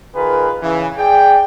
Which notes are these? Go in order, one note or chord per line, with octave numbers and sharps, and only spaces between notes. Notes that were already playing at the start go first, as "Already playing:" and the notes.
D#3 F4 G#4 A#4 B4
C#3 E3
G#4 D5 G5